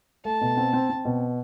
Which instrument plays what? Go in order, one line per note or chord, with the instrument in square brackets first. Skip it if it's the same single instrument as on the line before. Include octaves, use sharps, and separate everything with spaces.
[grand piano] A3 [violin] A5
[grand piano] B2
C4
C4
C4
B2